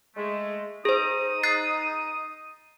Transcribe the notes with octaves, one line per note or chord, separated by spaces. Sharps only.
G#3 A3
D#4 G#4 C5 D#6
F#6 A6 C7